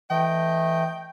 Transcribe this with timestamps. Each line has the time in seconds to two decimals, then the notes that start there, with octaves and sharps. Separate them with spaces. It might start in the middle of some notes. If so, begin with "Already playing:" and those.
0.10 E3 A3 D#5 G5